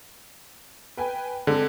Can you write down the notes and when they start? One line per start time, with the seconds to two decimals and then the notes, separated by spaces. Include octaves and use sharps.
0.97 B4 G5 G#5
1.47 D3 G#3 C4